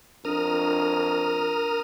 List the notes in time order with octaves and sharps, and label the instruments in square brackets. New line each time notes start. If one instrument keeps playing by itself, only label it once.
[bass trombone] F2 [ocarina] D4 [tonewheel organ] A#4 D#6 F6